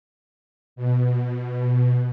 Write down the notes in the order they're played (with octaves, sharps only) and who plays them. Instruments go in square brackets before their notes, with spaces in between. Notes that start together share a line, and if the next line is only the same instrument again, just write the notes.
[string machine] B2